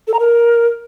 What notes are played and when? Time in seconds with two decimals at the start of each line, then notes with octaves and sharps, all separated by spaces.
0.07 A4
0.13 A#5
0.19 A#4